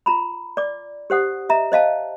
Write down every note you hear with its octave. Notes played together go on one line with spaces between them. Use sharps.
F4 A#5 B5
D5 D6
G4 C5 F#5 D#6
D#5 E5 A#5
C5 D#5 F5 A5